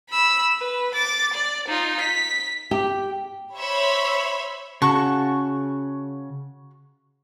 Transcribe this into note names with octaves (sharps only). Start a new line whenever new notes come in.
B5 E6
B4
D6 A6
D5
D#4 F4
B6
G4
C5 C#5 E5 B5
C#3 F#4 A5 C#6